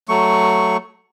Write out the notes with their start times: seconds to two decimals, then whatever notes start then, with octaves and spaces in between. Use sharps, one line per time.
0.09 F#3 A3 C#6